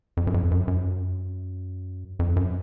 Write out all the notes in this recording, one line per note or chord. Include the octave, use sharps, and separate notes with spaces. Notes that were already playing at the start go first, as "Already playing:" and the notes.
F2
F#2
F2
F#2
F#2
F2
F#2